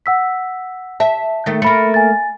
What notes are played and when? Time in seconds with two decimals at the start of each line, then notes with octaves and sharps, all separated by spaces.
0.06 F#5 E6 B6
1.00 E5 A5
1.46 D#3 A3
1.62 A3 A#3 B5 C#7
1.94 G#5 A6